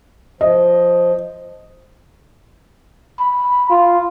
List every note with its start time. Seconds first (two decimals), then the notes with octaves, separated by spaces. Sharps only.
0.41 F3 D#5
3.19 B5
3.70 F4